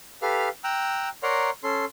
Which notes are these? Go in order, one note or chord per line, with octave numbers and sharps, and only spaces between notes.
G4 A4 B4 F5 F6
G5 A#5 E6 F#6
A#4 C#5 D5 F#5 A#5 C6
C#4 A4 C6